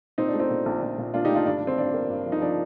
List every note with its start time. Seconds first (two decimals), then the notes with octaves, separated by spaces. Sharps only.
0.18 A#2 C4 D#4
0.28 D4
0.34 A3
0.39 C4 D#4
0.50 A#2
0.66 A#1
0.82 A#1
0.98 A#2
1.14 A#2 D4 F4
1.25 D#4 G4
1.30 A3 D4 F4
1.46 G2 D4
1.57 D4
1.62 G2
1.67 C4
1.78 A1 D4
1.94 A#3
2.10 G2
2.26 F3
2.32 D#4
2.41 F3 D4